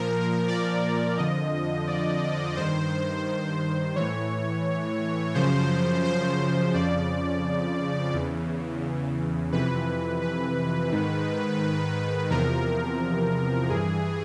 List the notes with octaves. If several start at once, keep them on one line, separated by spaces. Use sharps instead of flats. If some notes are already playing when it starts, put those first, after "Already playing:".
Already playing: A#2 F3 A#4
D5
F2 D3 F3 D#5
D5
G2 D#3 C5
A2 E3 C#5
F#2 C#3 F3 C5
C5
F2 C#3 F3 D5
E2 C#3 E3
F2 C3 E3 B4
B4
G#2 D#3
E2 C3 F3 A#4
G2 E3 G#4